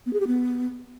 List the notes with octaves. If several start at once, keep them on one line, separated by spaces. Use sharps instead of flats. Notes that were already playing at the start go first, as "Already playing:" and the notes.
B3
G#4
G4
B3